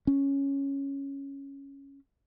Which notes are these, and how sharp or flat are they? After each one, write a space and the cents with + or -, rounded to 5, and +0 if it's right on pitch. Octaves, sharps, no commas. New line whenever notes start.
C#4 -5